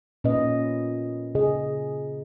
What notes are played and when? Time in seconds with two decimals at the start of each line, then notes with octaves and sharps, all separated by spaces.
0.24 A#2 C#4 B4 D#5
1.35 C#3 G#4 D#5